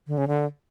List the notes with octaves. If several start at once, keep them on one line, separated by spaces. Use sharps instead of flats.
D3
C#3
D3